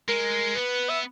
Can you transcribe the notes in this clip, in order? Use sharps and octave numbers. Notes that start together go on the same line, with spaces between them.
G#3 A#4
B3 B4
E5